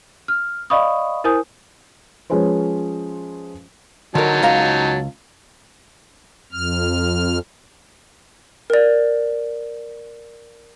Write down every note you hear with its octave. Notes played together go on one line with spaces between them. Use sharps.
F6
D5 D#5 F5 B5 C#6 D#6
E4 A#4 C5 G#5 D#6 G6
F3 G#3 C#4 G#4 B4 C5
D3 F#3 D#4 A#4 A5
C#2 F5 A#5
F2 F6
A#4 D5